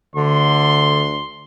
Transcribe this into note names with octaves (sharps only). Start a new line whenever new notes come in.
D2 D3 C6